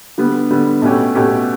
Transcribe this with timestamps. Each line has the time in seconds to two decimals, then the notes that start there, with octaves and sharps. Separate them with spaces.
0.18 D3 G3 B3
0.51 D3 G3 B3
0.82 B2 A3 C#4 G4
1.15 B2 A3 C#4 G4